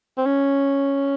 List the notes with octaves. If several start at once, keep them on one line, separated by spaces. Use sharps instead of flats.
C4
C#4